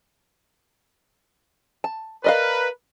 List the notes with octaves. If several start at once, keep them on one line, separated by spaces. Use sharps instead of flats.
A5
A#4 B4 D5 D#5 F5